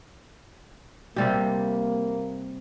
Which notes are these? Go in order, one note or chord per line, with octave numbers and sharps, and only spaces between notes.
C3 G3 A#3 G4